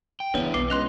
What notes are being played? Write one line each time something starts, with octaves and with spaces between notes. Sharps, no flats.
G5
E2 C#3 B3 D4 B4 C#5
B1 B4 D6 C7
C#2 C#3 D#5 C6 F#6 F7